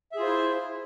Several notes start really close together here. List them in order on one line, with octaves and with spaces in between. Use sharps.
E5 G#4 F4 C5 E4